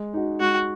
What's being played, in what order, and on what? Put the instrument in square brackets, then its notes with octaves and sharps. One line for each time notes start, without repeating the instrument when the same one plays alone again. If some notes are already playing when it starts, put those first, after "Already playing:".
Already playing: [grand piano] G#3
D#4 F#4
[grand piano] G#3 [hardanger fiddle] F#4